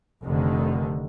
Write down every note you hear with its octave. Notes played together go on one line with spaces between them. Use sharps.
F1 D3 D#3